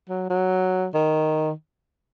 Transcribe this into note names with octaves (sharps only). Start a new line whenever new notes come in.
F#3
F#3
D#3